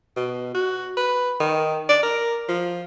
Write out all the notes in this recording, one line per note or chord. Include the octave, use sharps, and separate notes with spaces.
B2
F#4
B4
D#3
D5
A#4
F3